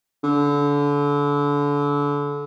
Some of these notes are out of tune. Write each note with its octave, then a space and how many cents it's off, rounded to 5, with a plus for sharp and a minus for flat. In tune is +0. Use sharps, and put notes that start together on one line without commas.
D3 -30